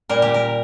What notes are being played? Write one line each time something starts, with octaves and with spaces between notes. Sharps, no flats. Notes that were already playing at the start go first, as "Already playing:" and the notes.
A#2 G3 A#4
G4
A#4